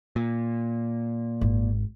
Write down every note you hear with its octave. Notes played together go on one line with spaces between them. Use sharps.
A#2
G#1